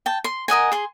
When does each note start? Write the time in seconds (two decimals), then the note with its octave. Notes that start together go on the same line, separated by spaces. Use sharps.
0.06 G5 A5
0.24 C6
0.48 A#4 D#5 F#5 G#5
0.72 G#4 C6